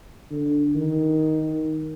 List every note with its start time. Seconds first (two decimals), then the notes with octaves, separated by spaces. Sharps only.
0.31 D3
0.75 D#3